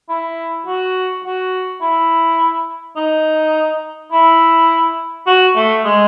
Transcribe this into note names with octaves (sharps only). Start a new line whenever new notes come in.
E4
F#4
F#4
E4
D#4
E4
F#4
A3
G#3